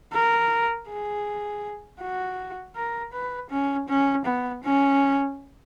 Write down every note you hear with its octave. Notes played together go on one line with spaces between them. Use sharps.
A#4
G#4
F#4
A#4
B4
C#4
C#4
B3
C#4